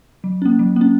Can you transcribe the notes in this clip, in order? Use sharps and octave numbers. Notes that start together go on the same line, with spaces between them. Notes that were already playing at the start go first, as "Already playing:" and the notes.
F#3
A#3 C#4
F#3
A#3 C#4